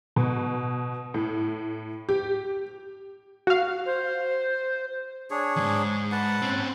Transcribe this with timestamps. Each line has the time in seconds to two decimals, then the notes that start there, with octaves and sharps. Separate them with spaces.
0.16 B2
1.14 A2
2.09 G4
3.47 F#4 F5
3.86 C5
5.31 D4 G#4 C#5
5.56 E2 G#2
6.12 B4 F#5 A5
6.42 C4 C#4